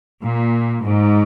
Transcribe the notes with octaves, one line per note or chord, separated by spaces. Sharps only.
A#2
G#2